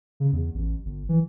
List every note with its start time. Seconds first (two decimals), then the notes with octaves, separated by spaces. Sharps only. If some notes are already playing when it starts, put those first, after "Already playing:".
0.20 C#3
0.32 E2
0.54 A1
0.85 G1
1.09 E3